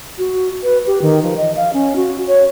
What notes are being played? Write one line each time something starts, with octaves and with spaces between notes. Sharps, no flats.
F#4
B4
G4
D#3
F3
D#5
F5
C#4
F#4
C#5